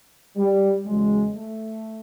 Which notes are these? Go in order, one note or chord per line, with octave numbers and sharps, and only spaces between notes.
G3
E2 C#3 F#3 G#3
A3